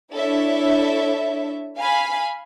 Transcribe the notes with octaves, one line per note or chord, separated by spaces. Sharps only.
D4 E4 A4 C#5 E5
F5 G#5 B5